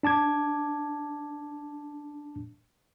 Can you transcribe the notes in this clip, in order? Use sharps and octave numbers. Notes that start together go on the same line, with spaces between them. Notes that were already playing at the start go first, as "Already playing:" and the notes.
D4 A5 D6 G#6